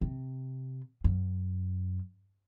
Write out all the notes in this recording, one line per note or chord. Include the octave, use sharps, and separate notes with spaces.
C3
F#2